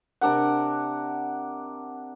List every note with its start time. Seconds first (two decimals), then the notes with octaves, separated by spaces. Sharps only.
0.21 C3 D4 A#4 F#5